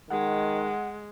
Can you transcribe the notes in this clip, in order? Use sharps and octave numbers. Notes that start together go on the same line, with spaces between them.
D#3 G#3 F#5